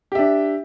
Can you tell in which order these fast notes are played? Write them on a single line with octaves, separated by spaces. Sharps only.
G4 E5 D4